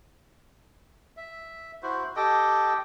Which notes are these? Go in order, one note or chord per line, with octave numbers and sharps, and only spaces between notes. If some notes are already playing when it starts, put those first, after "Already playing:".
E5
E4 F#4 C5
G4 A4 D#5 G5